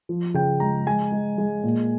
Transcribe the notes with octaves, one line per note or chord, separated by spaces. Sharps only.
F3
C#3 G5
G#3 A#5
G#3 G#5
G#3
G#3
A#2